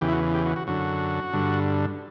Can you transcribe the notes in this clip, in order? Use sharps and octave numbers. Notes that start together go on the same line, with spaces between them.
E2 C#3 E3 G4
E4
F#4
G4
F#4
F#4
F#2 D3 F#4
G2 D3